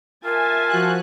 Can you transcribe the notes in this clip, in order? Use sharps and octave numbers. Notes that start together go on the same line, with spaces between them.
F4 A#4 E5 G#5 A5
F3 F#4 F#6